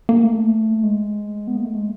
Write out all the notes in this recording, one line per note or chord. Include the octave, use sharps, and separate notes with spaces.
A#3
A3
G#3
B3
A#3
A3
G#3